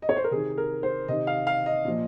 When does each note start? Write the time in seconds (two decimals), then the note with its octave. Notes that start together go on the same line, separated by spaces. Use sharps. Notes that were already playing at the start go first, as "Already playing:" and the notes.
0.02 D#5
0.09 C#5
0.16 C5
0.24 A#4
0.31 C3 D#3 G#4
0.57 A#4
0.83 C5
1.08 C3 D#3 D#5
1.27 F5
1.47 F5
1.66 D#5
1.85 A#2 F3